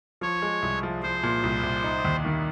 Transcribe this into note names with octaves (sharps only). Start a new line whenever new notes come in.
F3 C#5
G#3
C2
F3
F3 C5
A#2
C2
C2
D#4
D#2
D#3